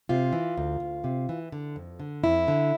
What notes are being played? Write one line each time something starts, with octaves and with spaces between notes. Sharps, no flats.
C3 F4
E3
D2
D2
C3
E3
D3
F2
D3
F2 E4
D3